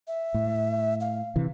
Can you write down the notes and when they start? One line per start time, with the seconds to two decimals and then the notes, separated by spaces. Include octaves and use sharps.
0.07 E5
0.34 A2
1.00 F5
1.36 C3 E3